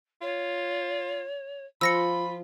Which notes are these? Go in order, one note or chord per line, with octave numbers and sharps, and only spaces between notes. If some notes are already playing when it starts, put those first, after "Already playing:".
F4 C#5
F3 F4 B5 E6 A#6 C#7